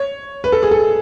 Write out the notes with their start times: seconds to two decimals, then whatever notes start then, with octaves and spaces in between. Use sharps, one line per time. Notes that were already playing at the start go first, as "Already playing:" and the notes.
Already playing: C#5
0.44 B4
0.52 A4
0.63 G#4
0.71 A4